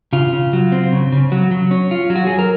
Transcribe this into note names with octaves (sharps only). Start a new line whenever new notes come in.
C#3 F4
C#3
F#3
C4
C#3
C#3
F#3
F#3
C#4
F4
F#3
F#4
F#3 G#4
A#4